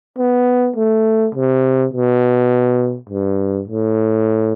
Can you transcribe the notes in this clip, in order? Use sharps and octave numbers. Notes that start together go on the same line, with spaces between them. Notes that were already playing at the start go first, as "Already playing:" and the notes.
B3
A3
C3
B2
G2
A2